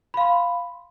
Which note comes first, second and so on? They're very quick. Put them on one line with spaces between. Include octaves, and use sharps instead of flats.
B5 F5 C6